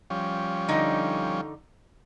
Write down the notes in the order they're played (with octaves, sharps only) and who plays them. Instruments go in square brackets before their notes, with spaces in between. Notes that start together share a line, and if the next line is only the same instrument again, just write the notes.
[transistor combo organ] F3 G3 C#4
[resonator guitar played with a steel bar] D3 D#4